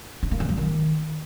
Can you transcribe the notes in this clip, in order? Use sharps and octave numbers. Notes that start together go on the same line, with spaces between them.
D4
A#3
E3
F3
D#3